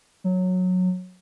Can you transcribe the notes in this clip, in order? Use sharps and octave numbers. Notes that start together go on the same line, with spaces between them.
F#3